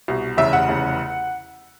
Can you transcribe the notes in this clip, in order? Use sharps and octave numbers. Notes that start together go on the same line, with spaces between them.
C2 B2
F1 E2 C#3 E5
F#5
F1 E2 C#3